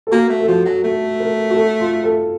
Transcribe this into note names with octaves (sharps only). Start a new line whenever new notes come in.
A4
A#3 F#4
A3
A4
F3 F#4
F#3
A3 A4
A#4
F#4
A4
F4
A4